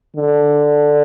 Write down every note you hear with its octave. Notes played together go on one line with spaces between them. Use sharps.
D3